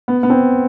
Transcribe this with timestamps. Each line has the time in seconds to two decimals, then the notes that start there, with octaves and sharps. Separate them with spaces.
0.08 B3
0.23 B3
0.30 C4